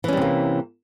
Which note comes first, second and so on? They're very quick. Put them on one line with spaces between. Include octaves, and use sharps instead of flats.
E3 C#4 G3 C3 A#3